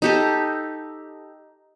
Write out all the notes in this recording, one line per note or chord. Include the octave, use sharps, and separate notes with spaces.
D#4 G4 A4